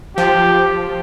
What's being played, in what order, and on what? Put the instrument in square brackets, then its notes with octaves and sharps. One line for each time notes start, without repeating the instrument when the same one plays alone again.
[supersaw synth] F3 [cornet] G4